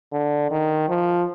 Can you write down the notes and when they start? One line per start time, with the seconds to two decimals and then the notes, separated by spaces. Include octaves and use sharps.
0.13 D3
0.51 D#3
0.89 F3